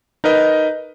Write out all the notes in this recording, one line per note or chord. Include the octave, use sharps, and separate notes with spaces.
D#4 A#4 B4 D#5